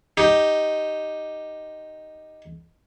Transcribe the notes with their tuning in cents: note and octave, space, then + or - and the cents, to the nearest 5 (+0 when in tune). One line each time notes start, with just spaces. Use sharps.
D#4 +0 G4 +0